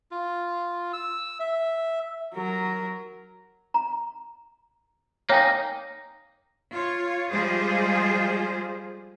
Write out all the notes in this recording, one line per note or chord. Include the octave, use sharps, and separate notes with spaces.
F4
E6
E5
F#3 A#4
A#5
A#3 D#4 C#5 G5 G#5
F4 C#5
F3 G3 G#3 F4 G#4 C5